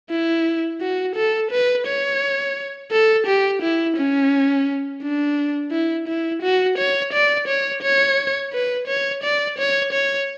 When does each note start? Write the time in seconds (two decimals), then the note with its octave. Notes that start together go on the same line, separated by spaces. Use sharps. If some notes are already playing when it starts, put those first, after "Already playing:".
0.10 E4
0.81 F#4
1.16 A4
1.51 B4
1.87 C#5
2.92 A4
3.27 G4
3.62 E4
3.97 C#4
5.03 D4
5.72 E4
6.08 E4
6.42 F#4
6.78 C#5
7.13 D5
7.48 C#5
7.83 C#5
8.53 B4
8.88 C#5
9.24 D5
9.58 C#5
9.93 C#5